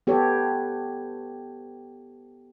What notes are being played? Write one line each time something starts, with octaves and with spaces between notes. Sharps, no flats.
B3 G4 A4 C#5